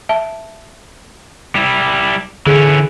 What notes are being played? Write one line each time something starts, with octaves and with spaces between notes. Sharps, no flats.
E5 A5
G3 E4
D3 E3 C#4 G#4